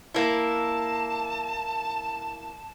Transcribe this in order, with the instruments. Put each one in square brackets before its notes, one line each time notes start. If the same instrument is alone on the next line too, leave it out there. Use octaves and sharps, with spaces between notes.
[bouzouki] A#3 E4 [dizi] A5